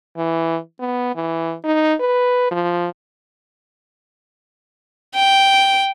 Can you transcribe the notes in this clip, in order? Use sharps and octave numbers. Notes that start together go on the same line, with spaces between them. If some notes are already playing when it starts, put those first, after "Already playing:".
E3
B3
E3
D#4
B4
F3
G5